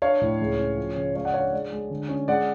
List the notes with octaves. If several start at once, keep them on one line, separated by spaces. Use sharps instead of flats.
D4 C#5 F5
A2
C#2
C#4
F3
C#3
G#3 C#5 F5
D5 F#5
D4 C#5 F5
G#3 D5
G#3
D3
C#4
G#3 D5 F#5